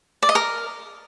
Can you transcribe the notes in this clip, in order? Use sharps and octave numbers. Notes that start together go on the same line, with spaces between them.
D5
D#5
A#4